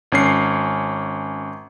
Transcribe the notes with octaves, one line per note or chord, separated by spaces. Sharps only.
G#1 C#4 C7